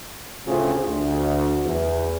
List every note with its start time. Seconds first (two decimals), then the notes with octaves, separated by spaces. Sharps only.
0.48 D2 A2 C#3 A3 C4 F4
0.87 D2
1.65 E2